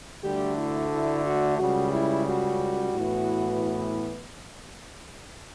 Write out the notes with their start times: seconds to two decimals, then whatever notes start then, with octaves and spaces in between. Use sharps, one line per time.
0.24 D2 D3 G3 A3 D4 G4
0.58 E4
0.92 E4
1.25 F#4
1.59 C#2 C#3 G3 F#4
1.93 E4
2.26 F#4
2.94 A2 E3 B3